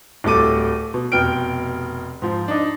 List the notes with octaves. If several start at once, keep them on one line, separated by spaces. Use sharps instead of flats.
D1 G3 A3 A4 D6 D#7
B2
F1 B2 G5 F6 D7
G#2 F3
D4 D#4